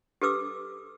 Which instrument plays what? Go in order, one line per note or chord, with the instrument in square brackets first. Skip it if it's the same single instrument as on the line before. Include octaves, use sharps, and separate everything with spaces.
[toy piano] G4 A4 B4 D6 E6